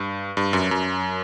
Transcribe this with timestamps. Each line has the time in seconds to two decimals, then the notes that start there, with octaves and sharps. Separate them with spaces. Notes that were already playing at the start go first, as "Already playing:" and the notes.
Already playing: G2
0.37 G2
0.53 F#2
0.71 F#2